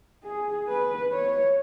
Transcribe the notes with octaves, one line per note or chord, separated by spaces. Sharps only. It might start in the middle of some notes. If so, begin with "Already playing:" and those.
G#4
B4
C#5